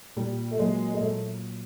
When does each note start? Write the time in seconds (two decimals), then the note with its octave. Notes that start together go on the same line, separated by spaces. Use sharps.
0.17 A#2 G3
0.51 A3
0.59 F#3 G#3 A#3
0.94 G#3
1.01 A#2 A3